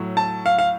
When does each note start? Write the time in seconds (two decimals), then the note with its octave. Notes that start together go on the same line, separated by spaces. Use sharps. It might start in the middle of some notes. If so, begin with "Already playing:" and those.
Already playing: A2 F#3
0.17 A5
0.46 F5
0.59 F5